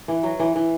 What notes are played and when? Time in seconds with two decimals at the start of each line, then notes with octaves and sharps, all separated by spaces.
0.08 E3
0.23 F#3
0.39 E3
0.56 E3